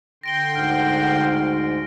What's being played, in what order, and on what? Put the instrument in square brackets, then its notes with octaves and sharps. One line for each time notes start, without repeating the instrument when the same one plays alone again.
[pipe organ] D3 G5 C6 [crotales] A#6 D7 G7
[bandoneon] D2 G#2 [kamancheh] F#5 [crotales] F6